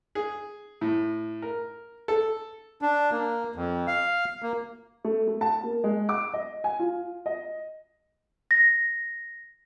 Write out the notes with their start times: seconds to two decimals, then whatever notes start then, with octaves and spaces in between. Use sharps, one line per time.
0.15 G#4
0.81 A2
1.42 A#4
2.08 A4
2.82 D4
3.11 A#3
3.56 F2
3.88 F5
4.42 A#3
5.04 A3
5.27 A3
5.41 A5
5.64 A#3
5.84 G#3
6.09 D6
6.34 D#5
6.64 G#5
6.79 F4
7.26 D#5
8.51 A#6